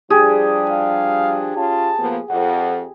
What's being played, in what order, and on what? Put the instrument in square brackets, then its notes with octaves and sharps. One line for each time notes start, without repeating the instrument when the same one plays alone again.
[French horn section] F3 G3 D4 [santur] G4 G#4
[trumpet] F5
[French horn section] C#4 F4 [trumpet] A5
[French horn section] F3 A#3 B3
[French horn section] F2 [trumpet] F#5